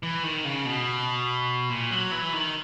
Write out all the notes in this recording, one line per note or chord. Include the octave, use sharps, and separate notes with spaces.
E3
D#3
C#3
B2
A#2
F#3
E3
D#3